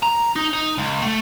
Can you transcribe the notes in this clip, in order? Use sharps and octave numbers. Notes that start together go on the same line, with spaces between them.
A#5
D#4
D#4
C#2
A3